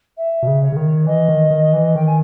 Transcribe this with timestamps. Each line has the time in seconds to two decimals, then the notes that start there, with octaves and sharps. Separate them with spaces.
0.17 E5
0.42 B2
0.47 C#3
0.62 C#5
0.72 C#3
0.76 D#3
1.06 E3 D#5
1.28 D#3
1.51 D#3
1.73 E3
1.95 D#3 G5
2.06 G#5